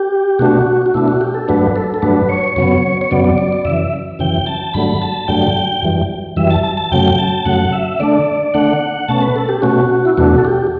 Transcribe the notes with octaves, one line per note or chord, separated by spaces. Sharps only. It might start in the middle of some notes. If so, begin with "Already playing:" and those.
Already playing: G4
B2 A3 D4 F#4
F#4
B2 A3 D4 E4
F#4
G4
A4
G2 F#3 A3 D4 B4
A4
A4
G2 F#3 A3 D4 B4
C#5
F#2 C#3 F#3 B3
C#5
F#2 C#3 F#3 B3 D5
D5
D5
D5
F#2 C#3 E3 E5
F#2 C#3 E3 G5
A5
G2 D3 F#3 A3 B5
A5
G2 D3 F#3 A3 G5
F#2 E3 G3
F#2 E3 G3 E5
A5
A5
A5
F#2 C#3 F#3 A3 G5
A5
F#2 C#3 F#3 A3 F#5
E5
D3 A3 D4 D5
D3 A3 D4 F#5
B2 A3 C#4 A5
B4
A4
G4
B2 A3 C#4 F#4
E4
E2 B2 A3 D4 F#4
A4
G4